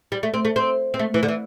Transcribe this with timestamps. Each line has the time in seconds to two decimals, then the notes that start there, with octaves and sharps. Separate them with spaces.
0.12 G3
0.23 A3
0.34 C4
0.45 A3
0.56 C4
0.94 C4
0.99 A3
1.14 E3
1.23 D3
1.28 E3